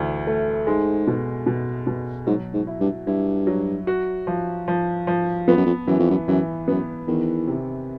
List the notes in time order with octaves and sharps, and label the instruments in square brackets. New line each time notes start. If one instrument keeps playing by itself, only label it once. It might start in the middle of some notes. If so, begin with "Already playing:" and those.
Already playing: [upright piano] D2 E3 A3
A3
[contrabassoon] G#2 [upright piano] G#3
[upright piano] B2
B2
B2
[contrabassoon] G#2 [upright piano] F#3
[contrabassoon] G#2
[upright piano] E4
[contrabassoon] G2
[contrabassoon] G2 [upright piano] E4
[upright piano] F#3
F#4
F3
F3
F3
[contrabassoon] F2 [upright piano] B3
[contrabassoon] F#2
F2
[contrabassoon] F#2 [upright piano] E3
[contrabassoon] F2
F#2
[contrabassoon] F#2 [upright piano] E3
[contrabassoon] F#2 [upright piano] B3
[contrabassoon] E2 [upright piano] D#3
[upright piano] C3